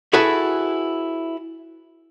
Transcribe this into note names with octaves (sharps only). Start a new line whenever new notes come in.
E4 F#4 G#4 A4 B4